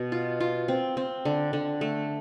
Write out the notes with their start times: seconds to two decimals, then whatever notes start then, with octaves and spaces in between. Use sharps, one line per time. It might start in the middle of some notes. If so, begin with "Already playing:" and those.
Already playing: B2
0.12 F4
0.40 F4
0.68 C4
0.97 C4
1.25 D3
1.53 D3
1.81 A3